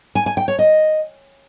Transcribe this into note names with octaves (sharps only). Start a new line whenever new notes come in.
G#5
G#5
G5
C#5
D#5